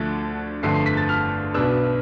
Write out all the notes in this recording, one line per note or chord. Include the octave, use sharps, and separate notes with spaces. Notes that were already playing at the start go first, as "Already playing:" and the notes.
Already playing: D2 D3 F3 A3
G1 F2 D3 A3 C4 C7
C7
B6
A6
F6
B1 B2 B3 D4 E6